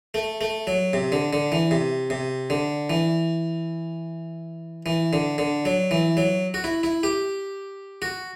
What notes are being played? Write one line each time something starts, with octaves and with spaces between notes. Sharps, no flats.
A3
A3
F#3
C3
D3
D3
E3
C3
C3
D3
E3
E3
D3
D3
F#3
E3
F#3
F#4
E4
E4
G4
F#4